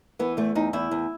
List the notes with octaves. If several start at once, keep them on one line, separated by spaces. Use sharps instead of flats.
E3 B3
E2 A3
E2 D#4
E2 E4
E2